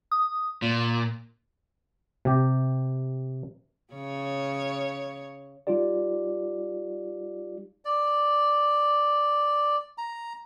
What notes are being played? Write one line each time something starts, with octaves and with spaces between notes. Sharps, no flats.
D#6
A#2
C3 G4
C#3 C#5
G3 D#4 F4 G4 D5
D5
A#5